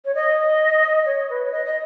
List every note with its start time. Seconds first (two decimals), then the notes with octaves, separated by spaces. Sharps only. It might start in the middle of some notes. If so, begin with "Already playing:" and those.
0.05 C#5
0.15 D#5
1.05 C#5
1.29 B4
1.44 C#5
1.52 D#5
1.65 D#5